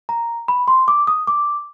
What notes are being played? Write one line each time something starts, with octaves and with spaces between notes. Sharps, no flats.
A#5
B5
C6
D6
D#6
D6